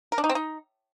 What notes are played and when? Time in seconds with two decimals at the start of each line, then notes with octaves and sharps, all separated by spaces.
0.12 A#4
0.18 D4
0.24 D#4
0.29 C4
0.35 D#4